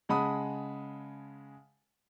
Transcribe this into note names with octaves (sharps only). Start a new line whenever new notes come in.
C#3 G#3 F#5 A5 B5 D#6